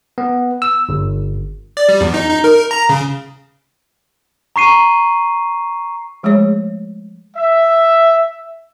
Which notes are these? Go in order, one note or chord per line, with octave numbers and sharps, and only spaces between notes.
B3
E6
G1
D5
G3
E2
D#4
D#4
A#4
A#5
C#3
A#5 C#6 C7 D#7
F3 G#3 A3 G#4 C#5 E5
E5